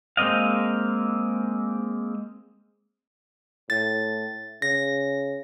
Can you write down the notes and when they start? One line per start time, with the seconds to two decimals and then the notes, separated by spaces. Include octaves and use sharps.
0.17 G#3 A#3 C4 D#5 F5
3.70 A2 A6
4.62 C#3 A#6